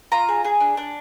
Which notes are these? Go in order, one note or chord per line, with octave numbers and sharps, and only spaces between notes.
F4 A#5
G#4
G#4
D4
D4